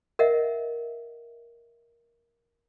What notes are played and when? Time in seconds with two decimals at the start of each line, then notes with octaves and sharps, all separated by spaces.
0.19 A#4 D#5 E5 F#5